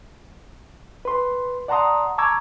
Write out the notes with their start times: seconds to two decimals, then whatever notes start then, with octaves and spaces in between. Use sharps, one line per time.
1.05 B4 C6
1.68 D5 F#5 A5 A#5 C6 D#6
2.18 A5 A#5 C#6 D6 E6 G#6